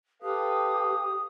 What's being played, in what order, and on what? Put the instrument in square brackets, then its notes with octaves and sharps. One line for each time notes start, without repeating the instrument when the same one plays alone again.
[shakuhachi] G4 [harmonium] A4 B4 F5 [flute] D#6